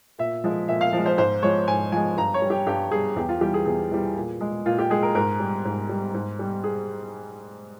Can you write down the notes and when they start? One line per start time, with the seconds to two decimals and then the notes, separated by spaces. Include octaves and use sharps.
0.18 A#2 E5
0.44 F3 G#3
0.68 A#2 E5
0.81 F5
0.93 F3 G#3
1.06 C5
1.18 G#2 C5
1.42 F3 G#3 C#5
1.68 G#2 G#5
1.92 F3 G#3 G#5
2.17 G2 A#5
2.34 C#5
2.42 G3
2.50 G4
2.67 G2 G4
2.91 G3 G#4
3.16 E2 G4
3.29 F4
3.41 E3 G3 G4
3.54 G#4
3.66 E2 G#4
3.91 E3 G3
4.16 A#2
4.41 G#3
4.66 A#2 F4
4.78 G4
4.90 G#3 G#4
5.02 A#4
5.15 G#2 A#4
5.40 G3
5.65 G#2
5.89 G3
6.14 G#2
6.39 G3
6.64 G#4